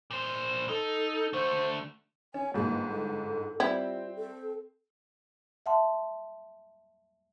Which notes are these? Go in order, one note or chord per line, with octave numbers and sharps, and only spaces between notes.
A#2 C5
D#4 A4
D3 A3 C5
C#4 G#5
G1 G#2 A#3
A4
G3 C4 E4 F4
A4
E5 F#5 A5 C6